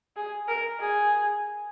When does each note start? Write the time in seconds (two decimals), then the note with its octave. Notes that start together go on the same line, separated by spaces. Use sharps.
0.16 G#4
0.48 A#4
0.80 G#4